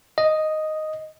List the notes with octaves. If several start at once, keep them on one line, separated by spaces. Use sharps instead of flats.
D#5